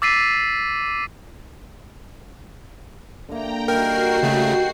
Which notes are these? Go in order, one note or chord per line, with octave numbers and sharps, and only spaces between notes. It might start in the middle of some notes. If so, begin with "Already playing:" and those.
D6 E6 A6 B6 C7 D#7
D3 A#3 G5 A#5
D#3 G3 A#3 F#4 A#4 G5 C7
C#3 A3